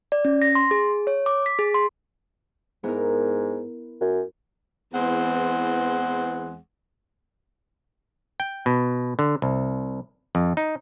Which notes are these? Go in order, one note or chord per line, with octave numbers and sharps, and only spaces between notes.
D5
C#4
A#6
C6
G#4
C#5
D6
B6
G#4
C6
G#2 B3 E4 A#4
F#2
E2 E3 G#3 C4 F#5
G5
B2
D3
C2
F2
D#4